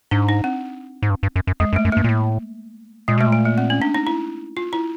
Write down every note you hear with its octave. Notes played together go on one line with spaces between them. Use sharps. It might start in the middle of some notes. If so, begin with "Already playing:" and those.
G#2 D4
D#4
C4
G#2
G2
G2
F#2
F#2
F2 G#3
F#2
A3
F#2
G2 A#3
A#2
A2
A#2 G#3
B2 A3
A#2
A3
A#3
C4
C#4
D4
D#4
E4
F4
E4